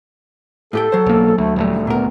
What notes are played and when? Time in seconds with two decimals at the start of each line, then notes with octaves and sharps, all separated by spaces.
0.73 A2 G4 A4 G5
0.92 F#3 C5
1.06 B1 A#3
1.38 D2 A3
1.56 D#1 D2 G3 A3
1.87 A#2 B3 A#4